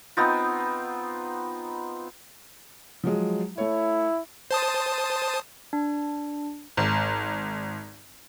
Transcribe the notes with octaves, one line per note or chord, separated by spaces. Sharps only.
B3 C4 D#4 F4
F3 F#3 G#3
A3 E4 C#5
C5 A5 D#6
D4
G#1